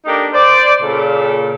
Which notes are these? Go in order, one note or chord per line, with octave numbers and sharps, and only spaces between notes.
A#3 D4 D#4 G4 A4 A#4
C5 D5
A#2 C#3 A4